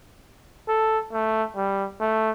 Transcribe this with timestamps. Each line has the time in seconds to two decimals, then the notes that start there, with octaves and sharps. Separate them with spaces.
0.68 A4
1.12 A3
1.56 G3
2.00 A3